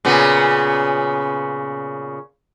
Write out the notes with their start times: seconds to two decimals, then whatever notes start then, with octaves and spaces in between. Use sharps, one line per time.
0.05 A#2 C#3 B3